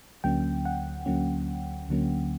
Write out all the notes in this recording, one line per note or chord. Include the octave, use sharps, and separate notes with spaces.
D2 D3 F#3 A#3 C#4 G5
F#5
D2 D3 F#3 A#3 C#4
D2 D3 F#3 A#3 C#4